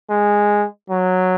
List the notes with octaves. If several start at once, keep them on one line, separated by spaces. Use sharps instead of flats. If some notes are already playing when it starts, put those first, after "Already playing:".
G#3
F#3